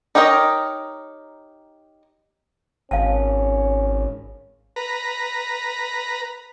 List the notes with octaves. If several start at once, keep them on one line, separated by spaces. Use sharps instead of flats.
D#4 G4 A#4 C#5 D#5
G#1 C#4 F5 A5
B4 A#5